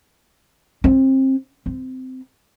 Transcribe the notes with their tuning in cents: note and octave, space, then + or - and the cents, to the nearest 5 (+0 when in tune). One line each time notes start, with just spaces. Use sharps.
C4 +25
C4 -20